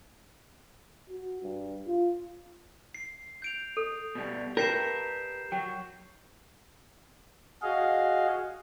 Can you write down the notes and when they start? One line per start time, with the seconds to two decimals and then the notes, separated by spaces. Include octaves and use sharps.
1.09 F#4
1.42 G2
1.87 F4
2.95 C7
3.42 G6 D7 F7
3.77 A4
4.15 B2 G3
4.57 G4 A#4 B4 G6 C7 E7
5.52 F#3 G5
7.62 F#4 G#4 D#5 F5